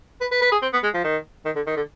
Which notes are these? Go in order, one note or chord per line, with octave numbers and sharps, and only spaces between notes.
B4
B4
B4
G#4
C4
B3
G#3
F3
D#3
D#3
D3
D#3
D3